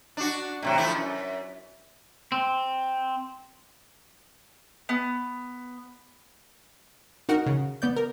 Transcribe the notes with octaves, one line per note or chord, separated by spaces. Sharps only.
D4 F#4
A2 C3 F#3
F3 A3 E4
F#2
C4
B3
D#4 F#4 A#4 F#5
C#3
B3 D5 G6
A#4